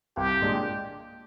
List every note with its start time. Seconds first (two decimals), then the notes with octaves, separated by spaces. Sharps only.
0.17 C2 G4
0.41 A#2 G#3 D4